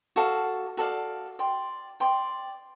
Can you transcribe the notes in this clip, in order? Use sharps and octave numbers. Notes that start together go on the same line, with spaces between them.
F#4 A4 D5 F5
F#4 A4 D5 F5
D5 G5 C6
D5 G5 C6